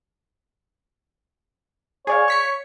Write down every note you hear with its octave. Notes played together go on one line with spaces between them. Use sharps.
G#4 C#5 D5 F5
C#6 B6 C#7